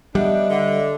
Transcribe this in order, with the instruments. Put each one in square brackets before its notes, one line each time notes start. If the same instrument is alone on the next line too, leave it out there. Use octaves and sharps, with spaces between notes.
[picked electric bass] G3 [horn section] B3 D4 [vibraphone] D#5 E5
[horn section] D3